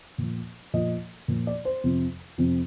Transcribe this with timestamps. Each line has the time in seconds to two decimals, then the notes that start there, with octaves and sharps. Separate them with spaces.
0.18 A#2 F3
0.74 A#2 F3 D#5
1.28 A#2 F3
1.47 D5
1.65 C5
1.84 F2 C3 F3
2.38 F2 C3 F3